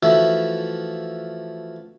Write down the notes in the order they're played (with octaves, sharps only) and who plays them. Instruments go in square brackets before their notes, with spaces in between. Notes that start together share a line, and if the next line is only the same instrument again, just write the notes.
[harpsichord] E3 F3 A3 F#4 E5